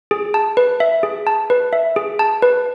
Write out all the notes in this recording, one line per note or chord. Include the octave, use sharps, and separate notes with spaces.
G#4
A5
B4
E5
G#4
A5
B4
E5
G#4
A5
B4